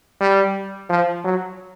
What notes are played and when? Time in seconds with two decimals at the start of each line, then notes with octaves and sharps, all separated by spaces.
0.20 G3
0.90 F3
1.24 F#3